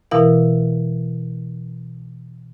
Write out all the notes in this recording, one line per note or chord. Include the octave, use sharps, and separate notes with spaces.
B2 E3 E4 A#4 F5